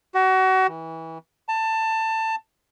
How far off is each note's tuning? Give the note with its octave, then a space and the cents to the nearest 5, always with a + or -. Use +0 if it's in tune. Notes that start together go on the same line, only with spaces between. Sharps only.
F#4 +30
E3 -25
A5 +20